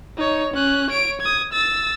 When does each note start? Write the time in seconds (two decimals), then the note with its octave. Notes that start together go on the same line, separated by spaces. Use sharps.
0.17 D#4 C#5
0.54 C#4 F#6
0.90 C#5 D7
1.21 D#6 G#6
1.53 E6 A6